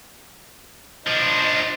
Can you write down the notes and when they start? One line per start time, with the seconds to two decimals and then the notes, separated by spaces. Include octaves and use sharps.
1.06 F3 D4 C5 D#5